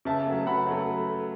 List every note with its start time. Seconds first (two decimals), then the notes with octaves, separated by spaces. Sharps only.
0.05 C#3 E5 A5
0.26 F#3 A3
0.47 C#3 F#5 B5
0.67 F#3 A3